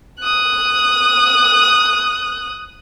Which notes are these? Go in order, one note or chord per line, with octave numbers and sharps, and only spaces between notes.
D#6 F#6